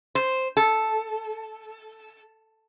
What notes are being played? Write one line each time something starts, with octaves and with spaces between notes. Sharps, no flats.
C5
A4